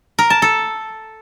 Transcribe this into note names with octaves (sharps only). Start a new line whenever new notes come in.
A#4
A5
A4